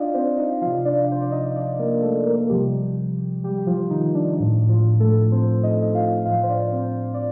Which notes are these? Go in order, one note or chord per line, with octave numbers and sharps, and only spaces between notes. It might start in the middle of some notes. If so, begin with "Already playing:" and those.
Already playing: D4 D#4 F4 D5 D#5 F5
C4 C5
D#4 D#5
C3 F3 F4 F5
D4 D5
C5
D5
D#4 D#5
D4 D5
A#3 A#4
A3 A4
A#3 A#4
C3 F3 G3 G4
G3 G4
G4
F3 F4
D#3 D#4
D4
A2 F3 D4
F3 F4
A3 A4
C4 C5
D#4 D#5
F4 F5
A2 F3 F4 F5
C5
D4 D5
C4 C5
D5